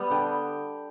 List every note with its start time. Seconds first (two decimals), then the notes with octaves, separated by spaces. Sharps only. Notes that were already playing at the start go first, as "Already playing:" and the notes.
Already playing: G3 B3 B5
0.10 D3 G5